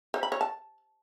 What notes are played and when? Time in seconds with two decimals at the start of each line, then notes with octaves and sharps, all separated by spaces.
0.14 C5
0.23 B5
0.32 C#5
0.41 A5